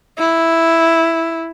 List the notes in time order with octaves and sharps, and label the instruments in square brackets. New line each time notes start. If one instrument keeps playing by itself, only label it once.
[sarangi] E4